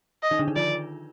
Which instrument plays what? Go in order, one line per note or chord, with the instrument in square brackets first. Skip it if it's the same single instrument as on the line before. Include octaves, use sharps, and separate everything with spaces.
[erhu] D#5
[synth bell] D#3 D#4
D3 D4
D#3 D#4
[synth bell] F3 F4 [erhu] D5